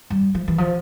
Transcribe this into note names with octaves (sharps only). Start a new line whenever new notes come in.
G3
F3
E3
F3